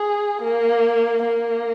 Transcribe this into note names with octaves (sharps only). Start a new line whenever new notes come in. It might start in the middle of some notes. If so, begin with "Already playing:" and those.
Already playing: G#4
A#3
A#3